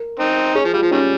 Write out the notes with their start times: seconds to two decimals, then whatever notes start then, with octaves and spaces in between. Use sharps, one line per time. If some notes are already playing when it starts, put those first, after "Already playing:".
Already playing: A#4
0.20 C4 D#4
0.55 C#4 G#4
0.65 F3
0.73 G3 F4
0.82 F3
0.91 D#3 G3 C#4